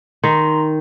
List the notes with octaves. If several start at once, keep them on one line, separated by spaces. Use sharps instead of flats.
D#3 A#5 C6